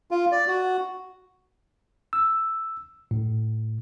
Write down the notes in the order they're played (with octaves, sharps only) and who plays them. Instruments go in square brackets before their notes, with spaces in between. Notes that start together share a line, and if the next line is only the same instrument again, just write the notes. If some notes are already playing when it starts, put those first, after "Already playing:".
[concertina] F4
D5
F#4
[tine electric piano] E6
A2